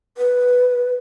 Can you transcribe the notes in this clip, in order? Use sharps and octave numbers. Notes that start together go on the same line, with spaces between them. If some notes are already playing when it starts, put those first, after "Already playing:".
B4